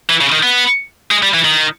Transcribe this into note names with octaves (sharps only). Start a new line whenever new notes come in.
E3
C#3
D#3
B3
G#3
G3
E3
D#3